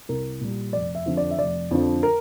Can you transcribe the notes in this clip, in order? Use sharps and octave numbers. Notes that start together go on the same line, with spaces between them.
C2 A#4
A#2 G3
F1 D5
E5
F2 D3 F3
D5
E5
F1 D5
F2 D3 F3
A#4